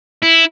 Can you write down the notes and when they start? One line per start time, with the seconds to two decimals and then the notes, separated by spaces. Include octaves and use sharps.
0.23 E4